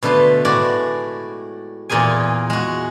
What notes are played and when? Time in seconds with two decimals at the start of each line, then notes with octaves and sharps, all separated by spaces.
0.03 B2 D3 A3 B4 C6
0.45 A2 G#3 F#4 D5
1.90 E2 A#2 F4 G#4 G#5
2.50 G#3 F#4